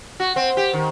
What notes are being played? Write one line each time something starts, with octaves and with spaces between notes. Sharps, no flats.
F#4
C4
G4
D#3